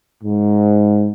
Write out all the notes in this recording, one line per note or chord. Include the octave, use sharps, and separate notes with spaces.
G#2